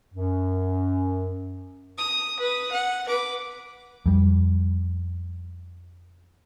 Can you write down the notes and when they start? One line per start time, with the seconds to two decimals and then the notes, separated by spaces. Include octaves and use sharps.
0.13 F#2
1.98 D#6
2.39 B4 D#6
2.72 F#5
3.08 B4 D6
4.06 F2 G3